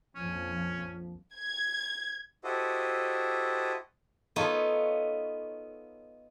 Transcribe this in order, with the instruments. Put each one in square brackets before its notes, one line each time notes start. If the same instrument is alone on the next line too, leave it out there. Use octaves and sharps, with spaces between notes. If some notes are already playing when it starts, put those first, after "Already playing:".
[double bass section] A#1 F2 F3 [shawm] C#4
[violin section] G#6
[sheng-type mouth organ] E4 F#4 G4 A4 C5 D#5
[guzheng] B3 D#4 F4 A4 C#5